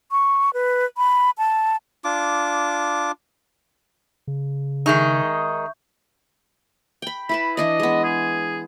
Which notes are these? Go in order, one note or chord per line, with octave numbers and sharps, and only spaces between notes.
C#6
B4
B5
A5
D4 F4 D6
C#3
D#3 G#3 D#4 E5 C#6 G6
G5 B5
E4 B4 A5 B5
E3 D4 D5 D#5
G#3 B3
G#4